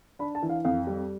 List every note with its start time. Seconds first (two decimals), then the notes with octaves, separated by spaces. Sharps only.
0.19 D4 B5
0.35 A5
0.42 E3
0.49 F5
0.65 F2 F5
0.87 G3